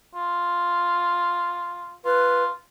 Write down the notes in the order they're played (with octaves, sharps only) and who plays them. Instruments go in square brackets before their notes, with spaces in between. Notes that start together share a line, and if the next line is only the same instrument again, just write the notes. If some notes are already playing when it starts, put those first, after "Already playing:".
[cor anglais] F4
[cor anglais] F4 [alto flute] B4